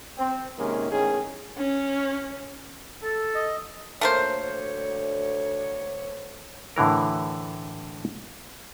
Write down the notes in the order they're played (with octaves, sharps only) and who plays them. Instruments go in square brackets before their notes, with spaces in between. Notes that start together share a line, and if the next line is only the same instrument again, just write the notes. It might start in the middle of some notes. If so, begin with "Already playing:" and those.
[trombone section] C4
C3 D#3 G#3 A#3 C#4
E2 A2 D#3 C#4 G#4
[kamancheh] C#4
[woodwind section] A4
[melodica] D#5
[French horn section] D2 C#5 [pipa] A3 A#3 C5
[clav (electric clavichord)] A2 D3 E3 A#4